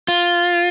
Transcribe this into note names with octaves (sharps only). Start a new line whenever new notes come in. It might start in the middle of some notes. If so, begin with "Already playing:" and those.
F4